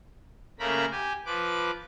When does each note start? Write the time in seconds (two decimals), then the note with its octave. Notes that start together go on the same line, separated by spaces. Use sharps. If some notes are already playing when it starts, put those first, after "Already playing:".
0.59 C#3 A3 A#3 A#4 A#5 B5
0.91 G4 G#5
1.26 F3 B4 D6